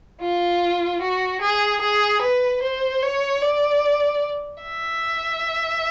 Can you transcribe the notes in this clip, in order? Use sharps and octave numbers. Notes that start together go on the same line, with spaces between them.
F4
F#4
G#4
G#4
B4
C5
C#5
D5
E5